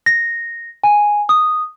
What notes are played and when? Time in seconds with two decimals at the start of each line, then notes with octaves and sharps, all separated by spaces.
0.06 A#6
0.84 G#5
1.29 D#6